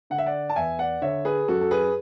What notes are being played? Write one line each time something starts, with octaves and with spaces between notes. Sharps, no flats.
D3 F#5
E5
D5 F#5
A5
E2 E5 G#5
D5 F#5
D3 C#5 E5
G#4 B4
F#2 F#4 A4
A4
G#4 B4